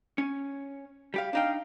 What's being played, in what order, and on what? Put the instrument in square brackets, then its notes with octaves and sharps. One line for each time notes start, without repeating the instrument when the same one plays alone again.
[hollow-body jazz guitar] C#4
G3 G4 F5
[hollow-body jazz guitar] D4 D#4 G5 [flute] F5